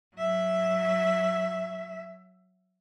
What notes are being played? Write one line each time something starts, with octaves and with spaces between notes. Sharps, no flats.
F#3 E5